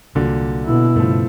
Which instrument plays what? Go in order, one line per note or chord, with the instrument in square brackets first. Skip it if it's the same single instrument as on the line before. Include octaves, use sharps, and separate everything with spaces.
[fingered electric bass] C2 [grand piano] A#2 D3 F#3
[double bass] B2 E4
[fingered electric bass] G2 C#3 [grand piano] F3 A3